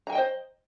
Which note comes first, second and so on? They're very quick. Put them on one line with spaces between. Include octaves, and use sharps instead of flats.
A#5 G#5 G5 D#5 C5